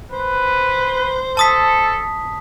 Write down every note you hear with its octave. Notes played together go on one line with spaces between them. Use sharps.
B4 C5
A4 A5 D#6 B6